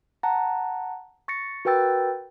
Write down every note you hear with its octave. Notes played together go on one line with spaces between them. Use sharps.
F#5 A5 A#5
C#6 A6 A#6 C#7
F#4 A#4 B4 G5 E6 A6